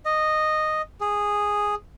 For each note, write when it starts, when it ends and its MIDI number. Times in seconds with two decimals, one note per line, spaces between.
0.05 0.82 75
1.01 1.75 68